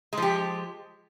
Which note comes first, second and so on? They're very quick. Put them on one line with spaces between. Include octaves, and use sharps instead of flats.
G#3 F3 G4